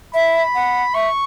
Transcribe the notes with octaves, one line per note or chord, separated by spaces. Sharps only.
E5 B5
F#5
E5 C#6